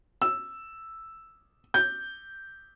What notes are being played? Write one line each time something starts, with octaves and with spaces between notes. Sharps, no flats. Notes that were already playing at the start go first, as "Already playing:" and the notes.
E6
G6